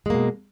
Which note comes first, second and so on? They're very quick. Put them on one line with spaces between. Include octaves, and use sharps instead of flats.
G#3 A#3 B2